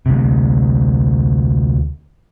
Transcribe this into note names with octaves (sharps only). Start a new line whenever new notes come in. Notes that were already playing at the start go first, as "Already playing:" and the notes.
D2 C3